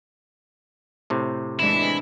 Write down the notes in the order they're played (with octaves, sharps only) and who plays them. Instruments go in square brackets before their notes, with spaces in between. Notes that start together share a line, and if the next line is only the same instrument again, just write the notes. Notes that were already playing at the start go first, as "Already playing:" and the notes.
[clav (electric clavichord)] A2 C3
[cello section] E3 G#3 D4 [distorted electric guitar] E4